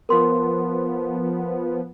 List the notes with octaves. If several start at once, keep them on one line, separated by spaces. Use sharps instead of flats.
F3 B3 A#4 C6